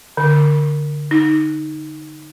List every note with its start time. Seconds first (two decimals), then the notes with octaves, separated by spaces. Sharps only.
0.17 D3
1.11 D#4